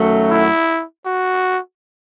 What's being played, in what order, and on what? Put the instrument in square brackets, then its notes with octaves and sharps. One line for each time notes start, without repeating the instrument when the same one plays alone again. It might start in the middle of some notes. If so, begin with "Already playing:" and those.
Already playing: [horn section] F#2 D#3 F#3 A3
[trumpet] E4
F#4